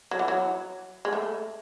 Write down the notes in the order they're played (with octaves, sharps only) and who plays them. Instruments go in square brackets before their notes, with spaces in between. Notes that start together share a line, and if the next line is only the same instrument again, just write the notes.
[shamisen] F#3
E3
F#3
G#3
A3